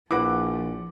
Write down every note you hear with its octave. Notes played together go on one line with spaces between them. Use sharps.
A#1 F3 E4 B4 F#5 D6